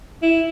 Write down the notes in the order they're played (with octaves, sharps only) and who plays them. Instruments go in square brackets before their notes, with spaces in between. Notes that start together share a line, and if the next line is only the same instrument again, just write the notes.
[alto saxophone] E4